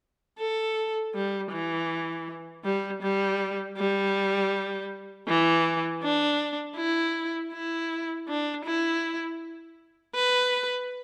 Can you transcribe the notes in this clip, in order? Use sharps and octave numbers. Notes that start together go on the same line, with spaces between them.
A4
G3
E3
G3
G3
G3
E3
D4
E4
E4
D4
E4
B4